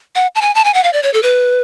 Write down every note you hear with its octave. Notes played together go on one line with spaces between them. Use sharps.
F#5
A5
G#5
A5
G#5
F#5
F5
D5
C#5
A4
B4